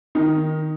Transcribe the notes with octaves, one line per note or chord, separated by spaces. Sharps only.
D#3 D#4